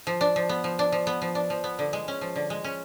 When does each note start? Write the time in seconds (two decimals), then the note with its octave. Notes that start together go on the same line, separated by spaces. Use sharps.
0.07 F3
0.21 D4
0.36 F3
0.49 B3
0.64 F3
0.79 D4
0.92 F3
1.07 B3
1.22 F3
1.35 D4
1.50 F3
1.64 B3
1.79 D3
1.93 G#3
2.08 C#4
2.21 F3
2.36 D3
2.50 G#3
2.64 C#4